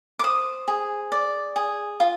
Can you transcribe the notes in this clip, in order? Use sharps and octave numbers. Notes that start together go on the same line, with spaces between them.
D6
C5 D#6
G#4
D5
G#4
F4